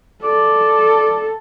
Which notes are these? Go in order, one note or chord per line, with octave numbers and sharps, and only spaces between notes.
A4 D5